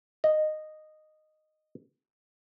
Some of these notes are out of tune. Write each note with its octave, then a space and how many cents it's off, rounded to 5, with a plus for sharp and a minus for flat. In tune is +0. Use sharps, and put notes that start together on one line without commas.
D#5 -10